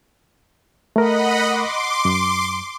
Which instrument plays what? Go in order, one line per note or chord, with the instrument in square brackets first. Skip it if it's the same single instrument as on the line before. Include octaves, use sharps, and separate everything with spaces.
[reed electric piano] A3 A#4 [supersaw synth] D#5 F#5 B5
[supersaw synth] C6 D6
[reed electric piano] F#2